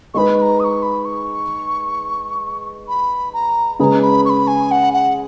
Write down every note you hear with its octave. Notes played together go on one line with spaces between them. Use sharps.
G#3 D#4 G#4 B4 B5 C#6
B5
A#5
D#6
C#6
B5
C#6
B5
A#5
C#3 G#3 C#4 G#4 B4 A#5 B5
B5
C#6
B5
G#5
F#5
F#5